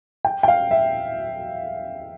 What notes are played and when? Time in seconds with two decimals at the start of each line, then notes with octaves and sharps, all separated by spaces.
0.25 G5
0.43 G5
0.48 F5
0.71 E5